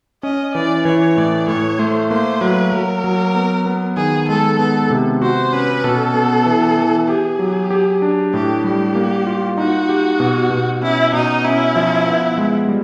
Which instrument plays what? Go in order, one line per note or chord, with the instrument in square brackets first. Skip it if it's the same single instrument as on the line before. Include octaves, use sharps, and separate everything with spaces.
[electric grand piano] C#4 [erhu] D#5
[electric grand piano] E3 [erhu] D5
[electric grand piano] E3 [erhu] C#5
[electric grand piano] A2 [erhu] D5
[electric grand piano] A2 [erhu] C#5
[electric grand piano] A3 [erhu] C5
[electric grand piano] A#3 [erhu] C5
[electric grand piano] F#3 [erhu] B4
[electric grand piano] F#3 [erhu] A#4
[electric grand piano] F#3
B3
B3
[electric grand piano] D#3 [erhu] G#4
[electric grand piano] G#3 [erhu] A4
[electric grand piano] B3 [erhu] A4
[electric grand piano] C3
[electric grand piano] F#4 [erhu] C5
[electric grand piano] C#4 [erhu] B4
[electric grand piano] B2 [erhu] A4
[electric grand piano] B3
E3
E3
[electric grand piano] G4 [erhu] G#4
[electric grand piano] F#3
G4
D4
[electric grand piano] A2 [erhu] G4
[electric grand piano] G3 [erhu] G4
[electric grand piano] A#3
F4
[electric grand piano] D#4 [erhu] F#4
[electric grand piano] G4
B2
B2
[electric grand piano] C#4 [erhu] E4
[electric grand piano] B2 [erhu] D#4
[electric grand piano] C#4 [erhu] E4
[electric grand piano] F3
B3
G#3
G3